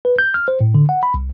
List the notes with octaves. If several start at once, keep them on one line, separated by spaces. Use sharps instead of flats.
B4
G6
F6
C5
A2
D3
F#5
B5
C2